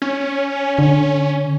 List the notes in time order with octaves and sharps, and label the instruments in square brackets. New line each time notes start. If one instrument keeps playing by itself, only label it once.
[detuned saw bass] C#4
[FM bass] D3